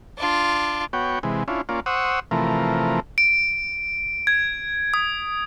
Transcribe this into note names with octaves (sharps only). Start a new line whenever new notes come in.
D4 F4
B3 F#4 C#5 G5
C3 E3 G#3
C#4 D4 E4 F4
A#3 C#4 F4 D5
C5 F#5 C#6 D#6 E6
C3 E3 F3 A3 A#4
D7
G#6
D#6